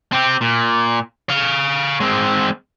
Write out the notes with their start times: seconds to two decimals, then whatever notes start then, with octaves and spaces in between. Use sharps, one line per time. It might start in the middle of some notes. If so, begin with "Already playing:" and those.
0.12 C4 G4
0.41 A#2
1.29 C#5 F5
2.00 G#3 C4